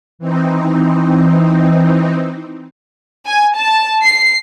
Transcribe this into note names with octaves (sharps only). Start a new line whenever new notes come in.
E3 C4 D#4
G#5
A5
C7